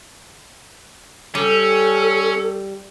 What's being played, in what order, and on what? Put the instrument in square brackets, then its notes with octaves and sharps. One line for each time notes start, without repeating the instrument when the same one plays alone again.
[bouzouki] G3 [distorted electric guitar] C#4 [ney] A4